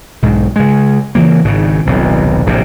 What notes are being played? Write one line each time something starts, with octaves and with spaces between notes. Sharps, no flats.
B1 G#2
C#3 G#3
C#3 E3 F#3 A#3
G#1 G#2 C#3
D#1 B1 C3
D1 A#1 C3